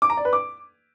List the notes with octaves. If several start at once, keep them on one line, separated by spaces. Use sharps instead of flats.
D6
A#5
D5
B4
D6